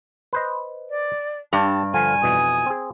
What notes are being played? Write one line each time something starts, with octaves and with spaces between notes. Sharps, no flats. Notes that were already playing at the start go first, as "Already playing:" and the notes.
B4 C5 D#5
D5
G2 G4 D5 A5
D3 F3 G#5 F6
F2 B2 E3 D#6
C4 G#4